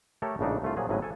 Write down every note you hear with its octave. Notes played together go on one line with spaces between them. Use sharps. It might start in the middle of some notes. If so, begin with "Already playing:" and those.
A3 G4 A4 A#4 C#5
A#1 A2 C#3 D4 D#4
C2 A3 F4
A#2 F3 F#3 G#4
G#1 A2 C#3 F#3 B4 G#5
A4 G#5